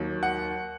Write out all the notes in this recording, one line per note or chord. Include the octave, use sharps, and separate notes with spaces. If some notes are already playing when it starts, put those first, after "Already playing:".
Already playing: D#2 D#3 F#3
F#5